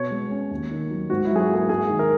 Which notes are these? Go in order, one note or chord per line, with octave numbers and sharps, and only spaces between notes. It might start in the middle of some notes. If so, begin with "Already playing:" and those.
Already playing: B2 C#5
G#3
C#4
D#2
D#3
F#3
G#2 F#4
E4
F#3 G#4
F#4
A#3
G#4
G#2 G#4
D#3
A#4